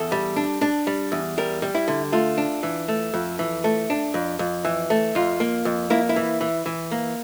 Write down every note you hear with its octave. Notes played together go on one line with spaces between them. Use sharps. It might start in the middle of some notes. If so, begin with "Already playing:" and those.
Already playing: E2 A4
G3
D4
D4
G3
E2
G3 A#4
G3
E4
D3
A3 F4
D4
E3
A3
F2
E3
A3
D4
F2
F2
E3
A3
F2 F4
A#3
F2
A#3 E4
E4
E3
E3
E3
A#3